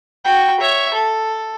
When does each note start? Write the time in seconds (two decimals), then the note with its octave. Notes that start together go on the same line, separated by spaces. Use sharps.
0.25 F#4 G5
0.60 C#5 E5
0.93 A4